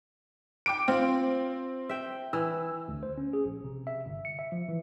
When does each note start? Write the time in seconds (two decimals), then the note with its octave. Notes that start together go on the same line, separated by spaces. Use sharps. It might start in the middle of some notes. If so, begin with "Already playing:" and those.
0.66 G5 D6 D7
0.88 C4 F4
1.89 E5 G5
2.33 E3 E6
2.88 D2
3.03 C5
3.18 C#4
3.33 G#4
3.45 A#1
3.64 C3
3.87 E5
4.06 G1
4.25 C#7
4.39 E5
4.52 F3
4.68 E3